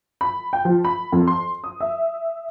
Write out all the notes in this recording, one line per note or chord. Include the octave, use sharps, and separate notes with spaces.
B5
G5
F3
B5
F2
C6
D#6
E5